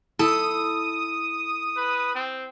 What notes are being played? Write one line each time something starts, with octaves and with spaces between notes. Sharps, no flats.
E4 A4 D#6
B4
C4